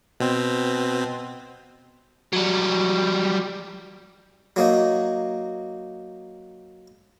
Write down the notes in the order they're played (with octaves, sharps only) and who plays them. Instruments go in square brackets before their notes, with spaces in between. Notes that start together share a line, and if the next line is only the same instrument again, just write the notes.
[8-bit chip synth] B2 C4
[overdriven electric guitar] F#3 G3
[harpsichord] F#3 A#3 D#4